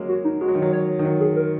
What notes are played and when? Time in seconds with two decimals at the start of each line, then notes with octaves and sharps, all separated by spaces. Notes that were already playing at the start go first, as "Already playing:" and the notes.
Already playing: F#3 G#3 A#3 C#4
0.09 F#4
0.24 D#4
0.41 G#3 F#4
0.48 F#3
0.55 D#3
0.62 F#3
0.72 C#5
0.99 D#3
1.05 F#3
1.20 G#4
1.36 A#4